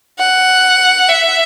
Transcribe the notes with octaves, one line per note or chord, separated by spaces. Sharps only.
F#5
E5